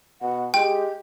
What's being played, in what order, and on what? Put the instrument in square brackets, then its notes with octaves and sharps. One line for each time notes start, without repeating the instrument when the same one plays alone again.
[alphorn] B2 [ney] F#5
[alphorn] G#3 [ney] G4 [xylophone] G5